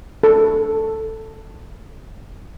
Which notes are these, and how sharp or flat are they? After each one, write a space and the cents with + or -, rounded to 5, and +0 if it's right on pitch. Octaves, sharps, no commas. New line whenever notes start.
A4 +5